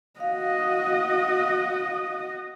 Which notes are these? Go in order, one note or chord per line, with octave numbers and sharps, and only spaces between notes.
F#4 D#5 F5